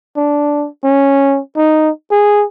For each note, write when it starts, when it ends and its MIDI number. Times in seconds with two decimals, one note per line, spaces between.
0.17 0.68 62
0.84 1.40 61
1.57 1.90 63
2.11 2.45 68